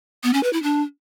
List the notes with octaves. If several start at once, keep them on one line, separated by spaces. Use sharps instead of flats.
B3
C#4
B4
E4
D4